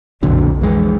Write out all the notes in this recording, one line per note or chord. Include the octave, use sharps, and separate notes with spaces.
B1 F2 A#2 D3 F#3
F2 E3 G#3